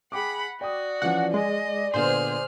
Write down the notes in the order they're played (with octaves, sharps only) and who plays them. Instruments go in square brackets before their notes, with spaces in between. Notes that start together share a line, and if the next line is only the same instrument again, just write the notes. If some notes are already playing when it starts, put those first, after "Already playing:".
[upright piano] G#4 G5 D6 [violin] F#5 B5
[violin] F#4 [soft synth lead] D5 [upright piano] G5 D#6
[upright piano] E3 F3 C#4 [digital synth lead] F#5
[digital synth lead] G#3 [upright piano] G#4 [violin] D#5
[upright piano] A#2 D3 B3 [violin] G#4 F6 [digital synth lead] C5